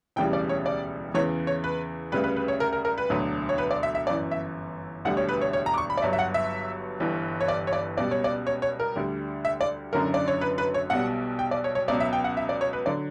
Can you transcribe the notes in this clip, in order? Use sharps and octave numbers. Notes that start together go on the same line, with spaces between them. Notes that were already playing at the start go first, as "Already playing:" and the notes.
E1 D2 C#3 E3 G3 G5
D5
C#5
D5
E2 C#3 E3 C#5
C#5
B4
D2 C#3 G3 B4
B4
B4
C#5
A#4
A#4
A#4
B4
E1 D2 D3 F#3
C#5
B4
D5
E5
E5
G1 F#2 E3 D5
E5
E1 D2 D3 G3 F#5
C#5
B4
C#5
C#5
A#5
D6
C#6
B5
D5
G1 G2 F#3 E5
E5
F#5
E5
G1 G2 E3 G3
C#5
D5
C#5
D5
C#2 B2 G3 D5
C#5
D5
C#5
C#5
A#4
D2 D3 G3
E5
D5
F#1 F#2 D3 F#3 A#4
D5
C#5
B4
B4
C#5
B1 B2 G3 F#5
G5
D5
C#5
C#5
C#2 B2 F#3 D5
E5
G5
F#5
E5
D5
C#5
B4
D3 F#3 D5